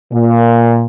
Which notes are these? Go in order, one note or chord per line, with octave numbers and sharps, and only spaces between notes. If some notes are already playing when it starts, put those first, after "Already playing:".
A#2